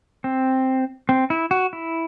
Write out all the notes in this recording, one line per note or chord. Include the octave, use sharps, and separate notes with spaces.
C4
C4
E4
F#4
E4